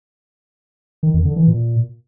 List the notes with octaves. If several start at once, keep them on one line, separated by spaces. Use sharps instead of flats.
D#3
F2
D3
E3
A#2